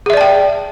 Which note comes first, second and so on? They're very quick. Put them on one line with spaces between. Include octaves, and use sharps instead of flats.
G#4 E5 D5 A5 G5